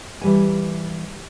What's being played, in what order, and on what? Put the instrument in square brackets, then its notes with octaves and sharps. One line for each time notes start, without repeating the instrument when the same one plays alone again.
[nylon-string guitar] E3 G3 G#5